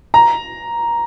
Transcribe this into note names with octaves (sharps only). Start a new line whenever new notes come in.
A#5